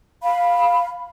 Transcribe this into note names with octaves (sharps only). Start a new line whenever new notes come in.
F5 B5